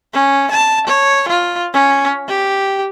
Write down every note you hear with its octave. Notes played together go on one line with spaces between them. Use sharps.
C#4
A5
C#5
F4
C#4
G4